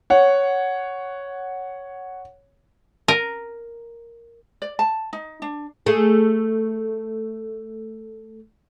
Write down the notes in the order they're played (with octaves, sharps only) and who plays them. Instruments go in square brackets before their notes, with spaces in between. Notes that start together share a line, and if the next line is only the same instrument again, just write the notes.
[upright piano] C#5 F#5
[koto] A#4
[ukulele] D5
A5
D#4
D4
[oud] A3 G#4